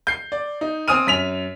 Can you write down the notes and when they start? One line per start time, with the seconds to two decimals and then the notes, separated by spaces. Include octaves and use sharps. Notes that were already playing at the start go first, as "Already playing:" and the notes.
0.07 G6 C7
0.32 D5
0.61 D#4
0.88 C4 G#5 D#6 F6 D#7
1.07 F#2 B6 F7